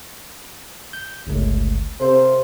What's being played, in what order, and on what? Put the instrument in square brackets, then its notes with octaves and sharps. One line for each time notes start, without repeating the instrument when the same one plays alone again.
[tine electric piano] G6
G1 C#2 A3
[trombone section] C3 C5 [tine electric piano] A4 A#4 F5